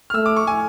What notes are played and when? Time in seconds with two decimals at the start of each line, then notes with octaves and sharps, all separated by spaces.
0.10 F6
0.14 A3 E6
0.26 D6
0.36 C#6
0.47 G#5